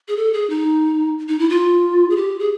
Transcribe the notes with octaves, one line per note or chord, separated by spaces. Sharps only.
G#4
A4
G#4
D#4
D#4
E4
F4
G#4
G4
G#4